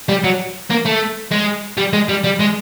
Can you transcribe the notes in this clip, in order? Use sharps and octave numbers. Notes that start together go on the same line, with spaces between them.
G3
F#3
A#3
A3
G#3
G3
G#3
G3
G3
G#3